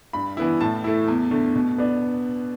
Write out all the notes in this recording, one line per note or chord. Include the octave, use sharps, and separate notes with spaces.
G2 B5
E3 B3 E4
A2 A5
A3 E4
E2
D3 A3
B2
B3 D4